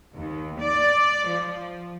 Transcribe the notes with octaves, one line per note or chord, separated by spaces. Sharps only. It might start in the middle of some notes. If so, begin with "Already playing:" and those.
D#2
D5
F3